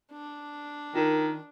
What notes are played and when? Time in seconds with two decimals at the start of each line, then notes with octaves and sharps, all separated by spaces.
0.12 D4
0.95 D#3 F4 A#4